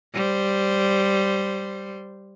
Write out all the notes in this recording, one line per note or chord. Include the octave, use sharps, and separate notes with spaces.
G3 C5